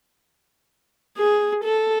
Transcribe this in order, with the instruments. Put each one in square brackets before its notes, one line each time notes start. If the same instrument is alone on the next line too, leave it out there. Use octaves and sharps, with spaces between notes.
[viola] G#4
A4